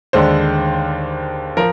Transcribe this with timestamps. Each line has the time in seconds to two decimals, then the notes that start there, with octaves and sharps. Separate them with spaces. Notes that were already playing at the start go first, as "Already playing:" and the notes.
0.13 D#2 D3 G#3 D4 C5
1.57 F3 A#4